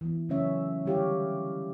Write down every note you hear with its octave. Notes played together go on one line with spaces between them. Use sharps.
E3 B3
C#3 F#3 A3 C#4 C#5 E5
D3 G3 E4 G4 C#5 F5